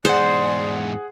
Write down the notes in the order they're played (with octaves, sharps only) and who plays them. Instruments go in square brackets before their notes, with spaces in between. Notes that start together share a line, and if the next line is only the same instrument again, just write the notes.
[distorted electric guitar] E2 G#2 [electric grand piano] G#4 F#5 [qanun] C5 [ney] D5